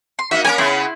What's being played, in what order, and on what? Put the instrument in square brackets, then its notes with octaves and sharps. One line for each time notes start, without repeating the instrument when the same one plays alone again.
[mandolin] C6
[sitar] A#3 D#4 F#4 [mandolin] E5
[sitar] A#3 C#4 A#4 [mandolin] G#5 B5
[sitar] C#3 B3 C#4 [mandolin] E4 C6